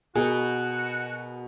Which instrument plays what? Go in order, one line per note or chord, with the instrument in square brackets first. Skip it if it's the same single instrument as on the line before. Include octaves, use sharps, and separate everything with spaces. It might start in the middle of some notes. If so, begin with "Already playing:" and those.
[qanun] B2 [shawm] F#4 [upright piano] G#4 A#4